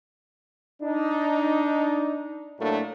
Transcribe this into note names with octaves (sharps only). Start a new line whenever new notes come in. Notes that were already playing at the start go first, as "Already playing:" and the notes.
D4 D#4
A2 F#3 A3 A#3 D4